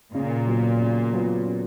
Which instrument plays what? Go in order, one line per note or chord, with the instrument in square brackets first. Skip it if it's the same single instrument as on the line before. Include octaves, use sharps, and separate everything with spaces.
[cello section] A#2 [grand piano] C#3
[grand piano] F#3 B3 F4
C#3
F#3 B3 F4
C#3